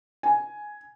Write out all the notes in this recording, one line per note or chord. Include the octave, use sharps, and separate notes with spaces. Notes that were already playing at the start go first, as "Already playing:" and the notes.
G#5